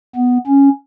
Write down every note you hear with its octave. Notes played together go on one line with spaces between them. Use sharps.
B3
C#4